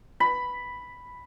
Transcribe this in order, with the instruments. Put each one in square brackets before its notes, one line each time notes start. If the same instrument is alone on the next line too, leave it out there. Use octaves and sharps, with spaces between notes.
[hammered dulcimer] B5